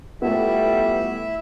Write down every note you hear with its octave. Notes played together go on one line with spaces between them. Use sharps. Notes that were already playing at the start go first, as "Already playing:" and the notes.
G3 A3 B3 E4 F4 A4 E5